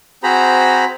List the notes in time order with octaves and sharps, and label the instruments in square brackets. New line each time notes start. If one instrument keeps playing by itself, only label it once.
[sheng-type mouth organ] C4 F#4 G#4 C5 A#5 B5